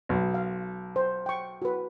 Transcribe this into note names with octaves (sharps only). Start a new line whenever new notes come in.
B1
F5
C5
G5 C#6
F#4 B4